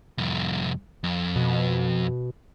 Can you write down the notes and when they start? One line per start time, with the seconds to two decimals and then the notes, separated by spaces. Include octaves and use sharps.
0.18 C2 F2
1.04 F2
1.36 B2